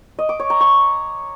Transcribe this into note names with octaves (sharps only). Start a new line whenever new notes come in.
D#5
D6
C#5
A#5
C#6